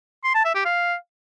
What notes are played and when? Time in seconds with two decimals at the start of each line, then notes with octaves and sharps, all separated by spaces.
0.24 C6
0.34 A5
0.45 E5
0.55 G4
0.65 F5